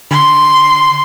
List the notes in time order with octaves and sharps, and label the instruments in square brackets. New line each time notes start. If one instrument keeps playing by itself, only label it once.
[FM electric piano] D3 [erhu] C6